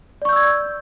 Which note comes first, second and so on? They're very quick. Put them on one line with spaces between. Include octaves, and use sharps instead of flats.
D5 C#6 G6 E6 G#6